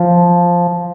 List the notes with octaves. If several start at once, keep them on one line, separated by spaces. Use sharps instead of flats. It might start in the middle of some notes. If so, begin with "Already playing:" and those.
Already playing: F3